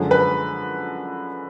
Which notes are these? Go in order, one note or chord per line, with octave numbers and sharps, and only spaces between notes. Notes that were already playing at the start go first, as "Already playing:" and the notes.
Already playing: F#2 D3 F3 G#3
B4